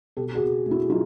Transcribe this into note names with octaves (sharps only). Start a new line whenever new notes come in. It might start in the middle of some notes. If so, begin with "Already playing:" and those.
B2 G4 A4
F#4 G#4
B2
A3
E4 F#4
F#3 D#4 F4